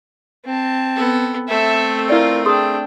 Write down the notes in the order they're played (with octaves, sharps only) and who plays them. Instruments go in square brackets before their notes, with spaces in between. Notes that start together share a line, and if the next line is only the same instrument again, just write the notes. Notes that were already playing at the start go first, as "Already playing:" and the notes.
[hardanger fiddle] C4 A5
[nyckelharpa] B3 A4
[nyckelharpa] A3 C4 [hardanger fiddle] A4 E5
[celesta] E4 D5 [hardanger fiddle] F4 A#4
[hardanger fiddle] D4 G5 [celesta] G#4 C6 D#6